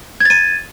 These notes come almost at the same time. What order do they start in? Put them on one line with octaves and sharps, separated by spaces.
G#6 A6 D#7